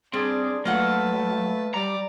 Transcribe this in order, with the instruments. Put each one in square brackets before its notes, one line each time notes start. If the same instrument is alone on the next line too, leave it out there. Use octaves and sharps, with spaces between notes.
[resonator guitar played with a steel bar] G3 [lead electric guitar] C4 [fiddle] D4 [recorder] G#4
[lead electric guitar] F#3 [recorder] A3 [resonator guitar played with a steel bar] A#3 F4 F#5 [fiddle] B4 A5
[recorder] G3 [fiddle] D5 [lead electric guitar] A#5